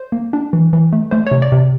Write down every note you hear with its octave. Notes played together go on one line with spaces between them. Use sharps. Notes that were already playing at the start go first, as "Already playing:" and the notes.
Already playing: C5
A#3
D4
E3
E3
A3
A3 C5
C3 C#5
D5
C3